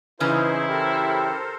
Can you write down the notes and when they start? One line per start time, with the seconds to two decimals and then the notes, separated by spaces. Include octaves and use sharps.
0.20 C#3 E3 C#4 D#4 E4 G#4 B4 C5
0.69 G4 A4 A#4 C5